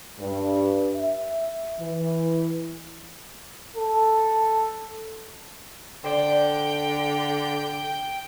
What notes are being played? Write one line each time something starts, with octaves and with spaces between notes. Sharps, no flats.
G2
E5
E3
A4
D3 C5 D5 G5